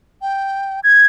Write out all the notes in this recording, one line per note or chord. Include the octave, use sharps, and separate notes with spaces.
G5
G#6